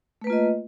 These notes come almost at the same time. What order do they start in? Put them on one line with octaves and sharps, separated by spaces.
A3 B4 A#3 F4 D#5